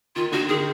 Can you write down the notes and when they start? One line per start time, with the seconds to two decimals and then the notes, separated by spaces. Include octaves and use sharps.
0.15 D#3 F4
0.32 D3 F#4
0.48 D#3 G#4